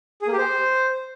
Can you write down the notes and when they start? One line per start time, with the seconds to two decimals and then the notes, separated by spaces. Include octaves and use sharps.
0.22 G#4
0.27 A#3
0.33 G4
0.38 C5